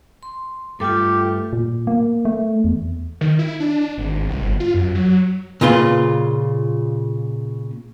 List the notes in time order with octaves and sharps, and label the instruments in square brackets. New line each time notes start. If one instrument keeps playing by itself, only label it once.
[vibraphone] C6
[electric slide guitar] G2 A3 [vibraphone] F4 A4 [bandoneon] G4
[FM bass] A#2
A#3
A3
E2
[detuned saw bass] D#3
E4
D4
G#1
C2
G1
F4
F#2
F#3
[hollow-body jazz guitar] A#2 C#3 F4 B4 C6